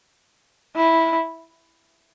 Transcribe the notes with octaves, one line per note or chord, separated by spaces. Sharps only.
E4